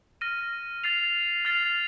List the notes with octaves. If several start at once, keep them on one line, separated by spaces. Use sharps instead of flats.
F6 A#6 D#7
F6 A6 C7 F7
F6 A6 C7 F7